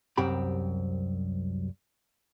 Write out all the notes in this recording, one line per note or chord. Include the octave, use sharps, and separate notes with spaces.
C2 F#2 C4 G4 B5